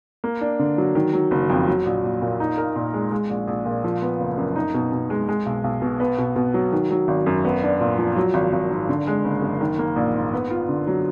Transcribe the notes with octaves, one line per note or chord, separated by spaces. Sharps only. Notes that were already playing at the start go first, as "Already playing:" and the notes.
A#3
D4
D3
F#3
D#3
F#3
F#1
F2
F#3
A#1
A#1
A#2
D#4
A#4
A#2
G#3
G#3
A#1
A#1
A#2
F3
B3
F#1
F#2
D#4
B2
B2
G#3
G#3
B1
B1
B2
B3
B2
B2
F#3
D#3
F#3
G#1
F#2
B3
D4
A#2
F3
F#3
G#1
G#1
G#2
D3
G#3
F#1
F#2
D#3
A#3
A#1
G#2
B3
F4
D3
F#3